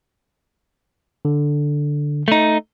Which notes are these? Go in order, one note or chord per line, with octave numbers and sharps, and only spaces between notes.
D3
A3 D#4